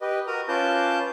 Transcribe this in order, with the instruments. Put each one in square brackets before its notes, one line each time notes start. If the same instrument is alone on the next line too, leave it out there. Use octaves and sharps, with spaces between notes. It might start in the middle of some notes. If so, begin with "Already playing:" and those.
[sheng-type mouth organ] G4 B4 D#5
F#4 A#4 A#5 D#6
C#4 F4 B4 A5 D6 G6